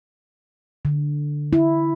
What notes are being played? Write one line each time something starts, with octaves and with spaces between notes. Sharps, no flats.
D3
E4